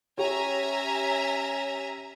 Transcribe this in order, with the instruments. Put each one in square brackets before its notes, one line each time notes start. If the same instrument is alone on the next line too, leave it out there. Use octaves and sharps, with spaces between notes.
[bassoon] C#4 [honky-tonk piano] G4 C#5 [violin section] E5 G#5 A#5